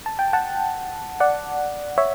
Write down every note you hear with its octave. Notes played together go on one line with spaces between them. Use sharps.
A5
G5
F#5 A5
D5 F#5
C#5 E5